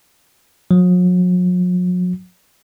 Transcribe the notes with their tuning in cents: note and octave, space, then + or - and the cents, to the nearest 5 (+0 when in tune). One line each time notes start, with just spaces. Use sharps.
F#3 -45